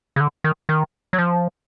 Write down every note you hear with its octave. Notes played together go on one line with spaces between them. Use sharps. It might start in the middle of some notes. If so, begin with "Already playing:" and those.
C#3
D3
D#3
D#3
F#3
F3